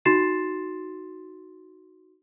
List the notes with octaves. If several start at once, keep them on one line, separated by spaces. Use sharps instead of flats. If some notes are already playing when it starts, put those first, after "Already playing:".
D#4 F#4 C6 A6 C7 E7